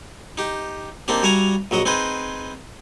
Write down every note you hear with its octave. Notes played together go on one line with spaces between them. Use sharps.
D#4 G4
A#3 C4 D4 D#4 G4
G3 F#4 E5 F5 G#5 A#5
A#1 F#3 F#4 D#5
C4 D#4 G#4 B4 C5